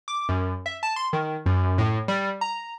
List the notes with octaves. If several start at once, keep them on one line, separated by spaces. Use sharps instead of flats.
D6
F#2
E5
A5
C6
D#3
F#2
A2
G3
A#5